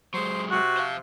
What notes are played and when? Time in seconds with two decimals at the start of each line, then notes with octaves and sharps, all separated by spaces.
0.14 F#3 G#3 C5
0.51 C3 F#4
0.77 C5 F5